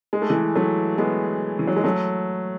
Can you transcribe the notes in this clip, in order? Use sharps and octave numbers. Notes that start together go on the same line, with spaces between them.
G#3
A3
E3 G#3
F#3 A3
G#3 B3
E3
F#3
G#3
F#3 A3